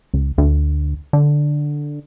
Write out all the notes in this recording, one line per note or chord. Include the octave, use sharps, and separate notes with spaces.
C#2
D2
D3